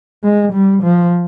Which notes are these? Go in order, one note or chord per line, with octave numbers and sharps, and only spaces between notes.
G#3
G3
F3